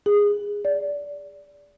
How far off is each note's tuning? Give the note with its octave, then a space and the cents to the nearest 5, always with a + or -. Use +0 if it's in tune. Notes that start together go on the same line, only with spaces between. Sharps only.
G#4 -20
D5 -20